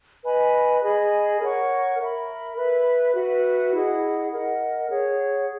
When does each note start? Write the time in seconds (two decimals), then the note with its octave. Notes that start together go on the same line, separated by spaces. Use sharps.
0.24 B4 D#5 G#5 B5
0.82 G#4 D#5 G#5 B5
1.40 A#4 C#5 F#5 C#6
1.99 A#4 E5 B5
2.56 B4 E5 B5
3.15 F#4 B4 E5
3.73 E4 G#4 D#5 F#5
4.32 A#4 D#5 F#5
4.89 G#4 C#5 F#5